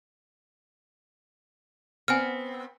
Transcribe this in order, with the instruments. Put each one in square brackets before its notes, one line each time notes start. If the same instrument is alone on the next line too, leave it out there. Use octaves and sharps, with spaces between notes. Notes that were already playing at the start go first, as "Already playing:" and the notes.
[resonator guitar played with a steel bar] B3 C4 [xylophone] G#5 F6